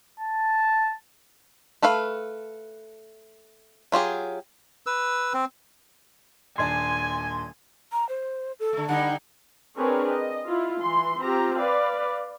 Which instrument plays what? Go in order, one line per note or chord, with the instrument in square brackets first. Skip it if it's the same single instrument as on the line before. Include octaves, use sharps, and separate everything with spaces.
[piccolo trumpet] A5
[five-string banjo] A3 A4 B4 F5
F#3 F4 G4 G#4
[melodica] B4 E6
C4
[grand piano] D#1 D4 A5 [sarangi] G#5 [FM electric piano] C6 G#6
[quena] A#5
C5
A4
[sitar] D3 A3
[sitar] D3 G3 D#4 [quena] F#5
[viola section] C4 D4 G#4 A#4 B4 C#5
D#5
E4 F4
E3 C6
C4 F4 G4 A#5
B4 D5 F5